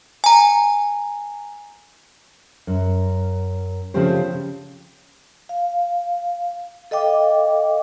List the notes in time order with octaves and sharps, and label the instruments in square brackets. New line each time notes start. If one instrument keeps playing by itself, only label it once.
[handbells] G#5 A#5
[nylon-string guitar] F#2
C#3 F3 A3 C4 G4 C5
[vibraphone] F5
A4 D#5 F5 G5 D6